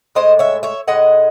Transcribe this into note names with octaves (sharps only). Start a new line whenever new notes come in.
A2 G#3 C5 D#5
C#5 E5
C#5 E5
A2 G#3 D#5 F#5